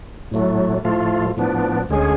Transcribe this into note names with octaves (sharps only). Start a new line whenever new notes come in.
A2 F#3 A3
A2 F3 A3 F4
A2 F3 B3 D4
D2 D3 G#3 C#4 G#4